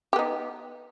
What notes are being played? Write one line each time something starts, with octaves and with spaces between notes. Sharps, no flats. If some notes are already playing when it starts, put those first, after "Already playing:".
B3 D#4 G4